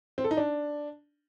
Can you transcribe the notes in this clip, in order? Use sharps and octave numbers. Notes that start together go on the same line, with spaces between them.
C4
A4
D#4
D4